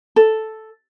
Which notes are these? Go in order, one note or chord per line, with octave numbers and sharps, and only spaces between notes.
A4